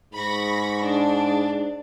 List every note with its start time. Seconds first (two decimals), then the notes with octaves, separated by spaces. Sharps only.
0.13 G#2 B5 C#6 A#6
0.83 D4